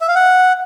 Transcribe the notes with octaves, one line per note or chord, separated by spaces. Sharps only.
E5
F5
F#5